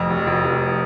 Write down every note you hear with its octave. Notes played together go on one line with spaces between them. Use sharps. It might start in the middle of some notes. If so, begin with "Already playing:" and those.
Already playing: F1 F2
F1
F1
F1